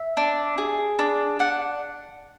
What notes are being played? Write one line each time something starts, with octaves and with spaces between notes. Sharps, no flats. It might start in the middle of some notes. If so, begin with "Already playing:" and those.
Already playing: E5
D4
G#4
D4
D4 F#5